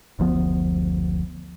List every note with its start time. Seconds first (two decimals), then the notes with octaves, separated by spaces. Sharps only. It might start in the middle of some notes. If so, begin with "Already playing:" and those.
0.19 F#1 D2 F3 B3